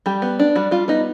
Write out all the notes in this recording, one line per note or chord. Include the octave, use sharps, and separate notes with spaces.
G3 G4
B3
D4
G3 F#4
G3 F4
B3 D#4